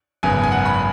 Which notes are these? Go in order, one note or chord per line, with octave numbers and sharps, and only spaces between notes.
G#1 F#2 C#3 B3 G#5
G#5
F#5
B5